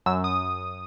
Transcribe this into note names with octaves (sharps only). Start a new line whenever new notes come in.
F#2 E6
D#6